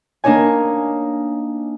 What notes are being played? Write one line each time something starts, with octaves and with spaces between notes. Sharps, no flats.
A#3 D4 D#4 C#5 G#5